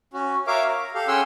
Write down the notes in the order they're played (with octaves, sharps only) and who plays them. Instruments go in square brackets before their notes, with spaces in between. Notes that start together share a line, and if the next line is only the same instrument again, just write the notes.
[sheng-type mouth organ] C#4 F#4
F#4 A#4 C#5 E5 F5 D6
A#5
G4 A4 F5
C#4 G#4 F#5 G5 C6 E6